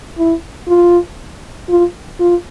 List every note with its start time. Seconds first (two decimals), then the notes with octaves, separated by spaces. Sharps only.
0.18 E4
0.68 F4
1.69 F4
2.20 F4